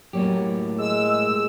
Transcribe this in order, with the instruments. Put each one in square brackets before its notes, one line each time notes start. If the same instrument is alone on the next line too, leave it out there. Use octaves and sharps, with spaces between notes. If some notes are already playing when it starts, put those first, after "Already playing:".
[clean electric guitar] A2 G4 [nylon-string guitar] F#3 A#3 C#5
[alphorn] G#3 [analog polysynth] E6